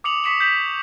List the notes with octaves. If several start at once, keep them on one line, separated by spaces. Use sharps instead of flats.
D6 D#6 C#7 F7 F#7
C#6 D#6 B6 C#7 E7 F#7
G6 B6 C#7 E7 F#7